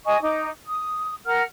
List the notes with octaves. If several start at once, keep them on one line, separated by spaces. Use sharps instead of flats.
D#5 G#5 C#6 D#6
D#4 D6
D#6
A#4 F#5 F6